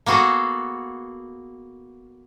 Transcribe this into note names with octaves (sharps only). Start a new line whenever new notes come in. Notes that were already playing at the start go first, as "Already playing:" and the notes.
A#3 B3 F#4 G#4 A4